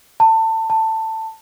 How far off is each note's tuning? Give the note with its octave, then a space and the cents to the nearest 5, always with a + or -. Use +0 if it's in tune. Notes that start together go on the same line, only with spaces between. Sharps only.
A5 +25
A5 +15